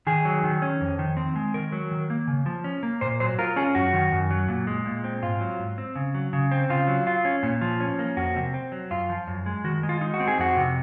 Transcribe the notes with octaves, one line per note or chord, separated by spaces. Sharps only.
D#3 G#4
F#3
D#3
C#4
F2
D#3
C4
G#3
D#3 A#4
F#3
D#3
A#3
C#3
F3
C#4
A#3
A#2 C5
F#3 C5
F4 A#4
C#4 G#4
F#2 F#4
D#3
F#2
F#3
A#2
G#3
A#2
C4
G#2 F4
F#3
G#2
C4
C#3
F#3
C#3
C4
C#3 F4
F#3
F4
C#4
A#2
F3
C#4
A#3
F2 F#4
C3
C4
F#3
F#2 F4
F3
F#2
G#3
D#3 F#4
G#3
F4
D#4
F#4
C4
G#4
F2 F#4
C3